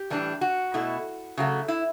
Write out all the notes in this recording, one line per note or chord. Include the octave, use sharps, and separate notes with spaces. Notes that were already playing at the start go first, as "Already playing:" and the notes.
Already playing: G4
A2 E3 G3 D4
F#4
B2 A3 E4
C#3 F#3 A3
E4